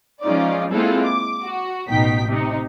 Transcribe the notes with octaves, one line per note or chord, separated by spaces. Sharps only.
F3 G#3 C#4 D#4 F4 D5
G#3 A#3 C4 E4 F4 A4
D6
F#4
A1 B2 D#4 G5 B6
C3 D#4